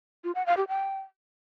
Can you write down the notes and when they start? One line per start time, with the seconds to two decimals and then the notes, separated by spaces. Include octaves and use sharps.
0.24 F4
0.35 F#5
0.46 F5
0.57 G4
0.68 G5